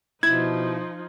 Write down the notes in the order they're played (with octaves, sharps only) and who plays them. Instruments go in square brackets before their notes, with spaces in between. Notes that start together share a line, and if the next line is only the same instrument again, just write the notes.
[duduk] B2 [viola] F3 D#4 [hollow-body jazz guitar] E4 [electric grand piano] G#6